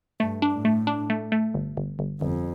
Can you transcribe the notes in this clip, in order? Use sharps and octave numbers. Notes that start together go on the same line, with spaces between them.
G2 A3
D4
A2
A3
D4
A3
A3
G1
G1
G1
G1 F2